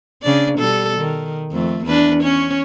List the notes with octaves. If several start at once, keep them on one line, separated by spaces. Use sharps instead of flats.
C#3 D4 D5
B2 G3 A4
D#3
F2 A3
E2 D4 B4
C#4 C#5